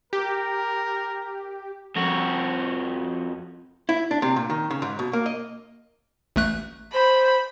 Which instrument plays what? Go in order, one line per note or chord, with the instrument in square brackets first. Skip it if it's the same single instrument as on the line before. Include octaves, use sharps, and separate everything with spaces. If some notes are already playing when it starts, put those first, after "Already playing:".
[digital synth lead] G4 [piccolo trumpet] A#4
[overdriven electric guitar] F2 F#4
[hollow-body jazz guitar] E4
D4
C3
A#2
D#3
C#3
G#2
B2
A#3
D#5
[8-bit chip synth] A1 A3 F#6
[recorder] C5 [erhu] B5